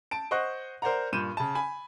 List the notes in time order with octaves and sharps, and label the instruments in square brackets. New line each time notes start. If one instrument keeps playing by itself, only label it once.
[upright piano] A5 D7
C5 D#5 F#5 C#6 F#6
A#4 C5 D5 F#5 A#5
G2 A#2 G6 D#7 E7
C#3 A5
G#5 B5